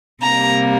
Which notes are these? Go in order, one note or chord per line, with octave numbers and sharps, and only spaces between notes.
C3 G3 A#3 A#5